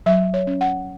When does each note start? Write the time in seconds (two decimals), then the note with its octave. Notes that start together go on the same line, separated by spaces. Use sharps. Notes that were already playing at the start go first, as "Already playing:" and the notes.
0.06 F#3 E5
0.34 C#5
0.47 C#4
0.61 F#5